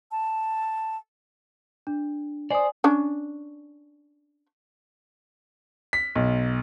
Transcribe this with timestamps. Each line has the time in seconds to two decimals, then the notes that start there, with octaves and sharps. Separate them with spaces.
0.11 A5
1.87 D4
2.50 C5 D5 G#5 D#6
2.84 C#4 D4
5.93 B6
6.15 B1